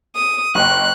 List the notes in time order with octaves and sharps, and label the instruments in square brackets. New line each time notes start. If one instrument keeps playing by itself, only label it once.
[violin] D#6
[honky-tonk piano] F#1 D#5 G5 [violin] F#6